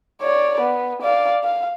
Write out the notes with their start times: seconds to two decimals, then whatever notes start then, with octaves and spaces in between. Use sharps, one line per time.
0.22 C#5 D5
0.60 B3
1.02 D5 F5
1.43 F5